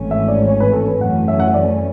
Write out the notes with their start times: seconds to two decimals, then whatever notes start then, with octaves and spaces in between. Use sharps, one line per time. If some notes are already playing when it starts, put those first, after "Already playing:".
Already playing: G#1 G#2 E3 A3 C#4
0.11 E5
0.28 D5
0.48 C#5
0.60 B4
0.73 A4
0.88 B4
1.00 F#2 E3 A3 C#4 F#5
1.28 E5
1.40 F#5
1.47 E5
1.54 D5